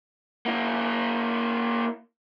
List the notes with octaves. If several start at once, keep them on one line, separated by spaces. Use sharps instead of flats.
A#3 E4